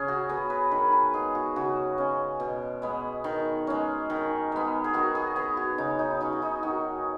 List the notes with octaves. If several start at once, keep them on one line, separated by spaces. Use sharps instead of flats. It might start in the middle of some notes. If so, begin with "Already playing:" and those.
Already playing: C#3 C#4 G#4
F#4
F#3 B3 G#4
B4
D#3 B4
B4
G#3 B3 G#4
F#4
C#3 F#4
G#3 C#4
B2
G#3 B3
D#3
G#3 C#4
D#3
G#3 B3
G#4
D#3 F#4
G#4
B3 G#4
F#4
C#3 D#4
D#4
F#3 C#4 D#4
F#4
D#4
D#3 F#4